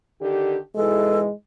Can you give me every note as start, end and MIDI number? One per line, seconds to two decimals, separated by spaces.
0.20 0.56 50
0.20 0.56 51
0.20 0.56 67
0.75 1.26 44
0.75 1.26 47
0.75 1.26 52
0.75 1.32 56
0.75 1.20 69